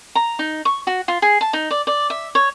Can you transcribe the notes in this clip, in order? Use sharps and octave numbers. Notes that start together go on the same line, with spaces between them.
A#5
D#4
C#6
F#4
F4
G#4
A5
D#4
D5
D5
E5
C#5